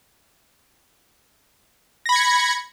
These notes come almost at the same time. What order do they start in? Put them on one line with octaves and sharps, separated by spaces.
A#6 B5 G#6 C#7